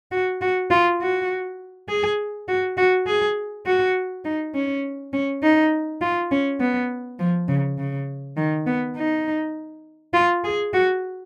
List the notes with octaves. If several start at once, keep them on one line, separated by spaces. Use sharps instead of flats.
F#4
F#4
F4
F#4
G#4
F#4
F#4
G#4
F#4
D#4
C#4
C#4
D#4
F4
C#4
B3
F3
C#3
C#3
D#3
B3
D#4
F4
G#4
F#4